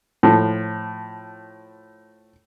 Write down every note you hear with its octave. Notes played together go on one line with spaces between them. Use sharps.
A2 F3